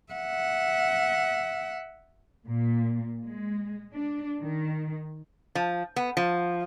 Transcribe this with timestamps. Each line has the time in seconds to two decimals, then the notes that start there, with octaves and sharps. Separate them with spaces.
0.12 E5 F#5
2.48 A#2
3.23 G#3
3.93 D4
4.42 D#3
5.55 F3
5.96 B3
6.17 F3